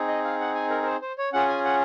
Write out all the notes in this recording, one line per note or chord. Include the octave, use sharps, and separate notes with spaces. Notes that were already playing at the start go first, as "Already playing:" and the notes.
Already playing: C4 D#4 G#4
D#5
F5
F#5
G#5
A#4
A#4
C5
C5
C#5
C#4 F4 G#4 F#5
G#5
F#5